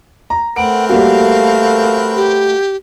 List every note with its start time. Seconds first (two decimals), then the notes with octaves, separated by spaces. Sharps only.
0.30 A#5
0.56 A3 C4 A#4 B4 F#5 D7
0.89 G3 A#3 F#4 F5
2.16 G4